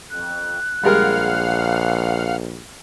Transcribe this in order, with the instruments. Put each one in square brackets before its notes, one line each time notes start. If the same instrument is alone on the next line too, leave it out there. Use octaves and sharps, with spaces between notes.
[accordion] F2 [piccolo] F#6
[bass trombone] A#1 [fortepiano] G3 G#3 A#4 [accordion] F5 F#5 F6